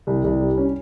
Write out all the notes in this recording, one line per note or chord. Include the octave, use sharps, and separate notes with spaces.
C2
C2
G3
C#4